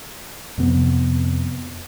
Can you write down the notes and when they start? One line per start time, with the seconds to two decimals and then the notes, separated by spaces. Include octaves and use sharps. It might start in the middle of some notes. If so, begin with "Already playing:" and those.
0.58 F2 C3 B3